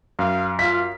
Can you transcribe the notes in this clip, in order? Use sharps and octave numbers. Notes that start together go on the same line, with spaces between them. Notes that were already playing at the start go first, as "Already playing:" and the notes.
F#2 F5
F4 F5 B6